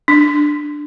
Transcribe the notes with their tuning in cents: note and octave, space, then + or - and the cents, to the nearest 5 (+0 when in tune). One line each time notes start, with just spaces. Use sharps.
D4 +10